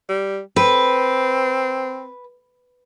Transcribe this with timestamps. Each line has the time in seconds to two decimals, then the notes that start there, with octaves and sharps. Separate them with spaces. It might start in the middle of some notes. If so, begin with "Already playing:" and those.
0.09 G3
0.56 C4 B4